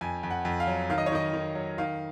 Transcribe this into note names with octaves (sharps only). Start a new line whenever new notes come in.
F2 G#5
F2
F#5
F2
F5
F#3
D#3 F5
D#5
C#5
D#3 D#5
D#3
F#3
D#3 F5